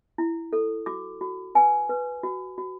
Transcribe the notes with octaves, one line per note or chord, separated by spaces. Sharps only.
E4
A4
F#4 D6
F#4
B4 G#5
B4
F#4
F#4